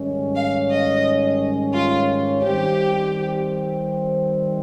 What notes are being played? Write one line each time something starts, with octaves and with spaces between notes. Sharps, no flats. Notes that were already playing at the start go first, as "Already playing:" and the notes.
Already playing: G#2 D#3 G3 C#4
F5
D#5
F4
D#3 G3 C4 G4